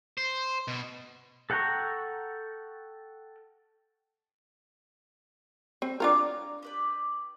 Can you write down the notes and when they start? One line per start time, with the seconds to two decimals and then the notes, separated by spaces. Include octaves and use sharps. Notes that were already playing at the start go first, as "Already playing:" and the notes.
0.18 C5
0.68 B2
1.50 A4 F#5 G5 A#5 C#6
5.82 C4 C5
6.00 D4 F4 A#4 C#5 A#5 D6
6.63 G4 B4 D5